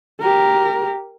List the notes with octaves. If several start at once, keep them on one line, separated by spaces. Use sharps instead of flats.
G4 A#4